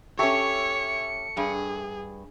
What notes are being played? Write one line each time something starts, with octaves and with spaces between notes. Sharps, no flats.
C#4 G4 A4 C#5 E5 C#6 C#7
G2 G#4